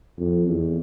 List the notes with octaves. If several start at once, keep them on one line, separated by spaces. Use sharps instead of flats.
F2
E2